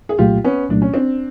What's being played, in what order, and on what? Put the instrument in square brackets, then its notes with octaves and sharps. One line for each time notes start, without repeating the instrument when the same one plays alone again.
[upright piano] G#4
[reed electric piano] C2 A#2 F#3 A3 [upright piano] F4 G4
[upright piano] B3 C#4
[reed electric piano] C2 A#2 F#3 A3 [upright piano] D4
[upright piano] C#4
C4 D4